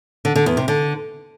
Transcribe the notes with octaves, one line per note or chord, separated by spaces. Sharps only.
D3
D3
E2
C3
D3